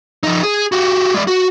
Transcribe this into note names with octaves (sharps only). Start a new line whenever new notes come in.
F3 D#4
G#4
F#4 G4
G#3 D5
F#4